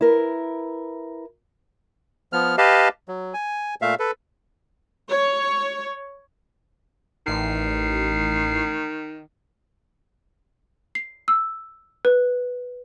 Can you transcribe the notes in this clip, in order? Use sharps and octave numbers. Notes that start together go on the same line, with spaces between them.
E4 A#4 B4
F3 B3 F6
G4 B4 D#5 F5 A5
F#3
G#5
A#2 A3 E5 F5
A4 B4
C#5
A1 D#3 C7
C7
E6
B4